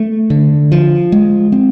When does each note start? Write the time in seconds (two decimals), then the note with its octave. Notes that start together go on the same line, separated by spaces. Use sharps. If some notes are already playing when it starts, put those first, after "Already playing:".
Already playing: A3
0.30 D3
0.72 F3
1.12 G#3
1.52 C4